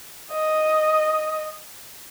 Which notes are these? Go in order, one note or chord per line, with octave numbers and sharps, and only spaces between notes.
D#5